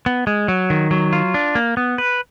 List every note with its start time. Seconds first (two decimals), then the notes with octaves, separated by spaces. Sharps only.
0.06 B3
0.27 G#3
0.48 F#3
0.70 D#3
0.91 F#3
1.13 F4
1.34 D4
1.55 A#3
1.77 B3
1.98 B4